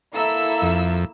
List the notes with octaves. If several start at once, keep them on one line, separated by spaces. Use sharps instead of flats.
A#3 E4 A4 E5 E6
F2